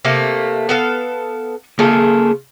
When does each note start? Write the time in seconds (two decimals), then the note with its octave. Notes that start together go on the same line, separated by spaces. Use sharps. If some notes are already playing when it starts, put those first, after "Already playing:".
0.05 C3 A3 A#3
0.69 B3 A4 F5
1.79 C#3 A#3 F4 G#4 A4